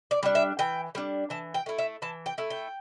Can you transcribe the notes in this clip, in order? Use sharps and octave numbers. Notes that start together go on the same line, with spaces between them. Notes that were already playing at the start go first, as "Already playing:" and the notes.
D5
G3 D4
E5
E3 G5
G3 D4
E3 A5
G5
A3 E4
E5
E3 A5
G5
A3 E4
G5